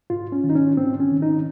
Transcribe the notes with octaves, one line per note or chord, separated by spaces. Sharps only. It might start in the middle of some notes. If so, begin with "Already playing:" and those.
G#2 F4
C#4
D#3
D#4
C#4
G#2 C4
C#4
D#3
D#4